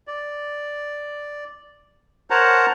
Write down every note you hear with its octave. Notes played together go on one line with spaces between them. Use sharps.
D5
A#4 C5 C#5 F#5 A5 A#5